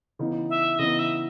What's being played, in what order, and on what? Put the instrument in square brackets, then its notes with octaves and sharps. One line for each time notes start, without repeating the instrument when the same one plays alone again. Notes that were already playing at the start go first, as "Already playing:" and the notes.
[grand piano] C#3 E3 B3 D#4
[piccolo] E5
[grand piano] C#3 E3 B3 D#4 [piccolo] D#5
[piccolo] E5